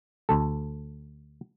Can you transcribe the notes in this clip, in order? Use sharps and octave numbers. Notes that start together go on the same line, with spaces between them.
D2 A4